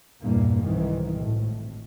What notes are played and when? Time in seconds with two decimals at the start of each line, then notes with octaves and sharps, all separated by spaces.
0.22 E2 G2 A#2 A#3
0.62 C2 G#2 D#3 E3
1.18 G#1 A2